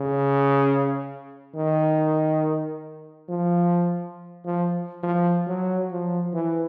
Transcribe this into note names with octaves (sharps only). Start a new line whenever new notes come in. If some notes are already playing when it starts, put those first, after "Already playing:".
Already playing: C#3
D#3
F3
F3
F3
F#3
F3
E3